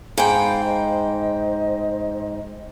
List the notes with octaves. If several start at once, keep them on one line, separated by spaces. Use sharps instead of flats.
G#2 G#4 F5 G5 B5
C5 D#5